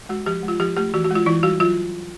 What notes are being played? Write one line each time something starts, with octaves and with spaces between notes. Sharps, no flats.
G#3 F#4
F3 G4
G#3
F4
F3 G4
A3 G4
E3 F#4
F#4
G#3 F4
E3 E4
G3 F#4
F#3 F4